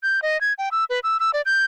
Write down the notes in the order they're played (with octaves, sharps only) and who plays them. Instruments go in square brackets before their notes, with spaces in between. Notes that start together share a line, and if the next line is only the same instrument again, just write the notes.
[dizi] G6
D#5
G#6
G5
E6
B4
E6
E6
D5
G6